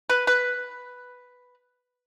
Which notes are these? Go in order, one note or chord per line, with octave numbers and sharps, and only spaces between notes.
B4
B4